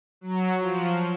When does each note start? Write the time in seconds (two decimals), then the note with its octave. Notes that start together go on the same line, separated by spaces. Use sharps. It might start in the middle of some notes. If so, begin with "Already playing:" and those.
0.21 F#3
0.59 F3